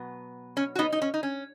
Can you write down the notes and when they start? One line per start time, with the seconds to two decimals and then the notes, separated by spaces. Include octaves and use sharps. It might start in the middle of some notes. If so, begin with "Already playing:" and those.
Already playing: B2 F#3 B3
0.57 C#4
0.75 F#4
0.79 B3 D#4
0.92 D#4
1.02 C#4
1.14 D#4
1.23 C#4